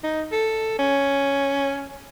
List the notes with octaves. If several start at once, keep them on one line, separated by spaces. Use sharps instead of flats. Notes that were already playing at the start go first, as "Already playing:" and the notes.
D#4
A4
C#4